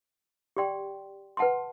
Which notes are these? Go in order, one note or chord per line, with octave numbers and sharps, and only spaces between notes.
G4 D5 G5 C6
B4 F#5 A5 C6